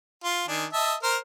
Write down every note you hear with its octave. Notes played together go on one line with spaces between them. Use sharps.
F4
D#3 D4 G#5
D#5 E5 A5
A#4 C5 F6